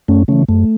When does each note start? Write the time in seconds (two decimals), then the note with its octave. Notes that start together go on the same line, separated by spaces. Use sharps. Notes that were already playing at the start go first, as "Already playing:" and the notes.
0.08 F#2 A3 C#4
0.28 C#3 E3 A3 C#4
0.48 F#2 A3